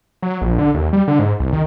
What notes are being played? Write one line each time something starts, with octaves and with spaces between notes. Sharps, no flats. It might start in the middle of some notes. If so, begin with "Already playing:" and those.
F#3
A#1
D3
D#2
G3
D3
G#2
C2
D#3